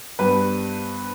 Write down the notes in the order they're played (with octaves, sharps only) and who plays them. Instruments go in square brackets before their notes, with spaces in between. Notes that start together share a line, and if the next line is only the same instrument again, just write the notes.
[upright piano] G2 G3 B3 B4